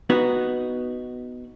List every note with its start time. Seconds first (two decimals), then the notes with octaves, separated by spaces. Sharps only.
0.10 B3 D#4 F#4